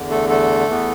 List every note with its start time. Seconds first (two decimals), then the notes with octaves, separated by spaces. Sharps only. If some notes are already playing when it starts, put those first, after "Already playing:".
Already playing: E2 D3
0.10 A3 A4
0.29 A3 A4
0.68 E2 E3 B3